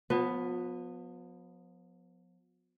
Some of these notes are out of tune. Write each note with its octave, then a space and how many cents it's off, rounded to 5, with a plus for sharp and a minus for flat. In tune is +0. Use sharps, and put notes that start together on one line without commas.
F3 +45 B3 +5